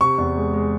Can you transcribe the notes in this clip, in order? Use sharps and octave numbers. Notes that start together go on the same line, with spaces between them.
C3 C#6
E2
G#3
G#3